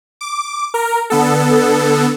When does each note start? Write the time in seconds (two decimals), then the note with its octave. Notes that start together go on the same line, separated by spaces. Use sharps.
0.21 D6
0.74 A#4
1.10 D3 B3 A4